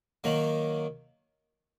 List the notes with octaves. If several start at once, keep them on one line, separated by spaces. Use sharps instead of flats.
D#3 F#3 A#3